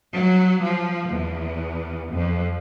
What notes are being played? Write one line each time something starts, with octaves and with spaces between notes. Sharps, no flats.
F#3
F3
E2
F2